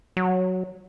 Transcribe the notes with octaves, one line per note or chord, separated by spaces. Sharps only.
F#3